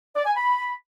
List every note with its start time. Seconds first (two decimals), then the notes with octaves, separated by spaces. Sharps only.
0.16 D5
0.26 G#5
0.36 B5